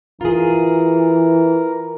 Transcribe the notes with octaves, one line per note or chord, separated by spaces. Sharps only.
E3 F4 G#4 A#4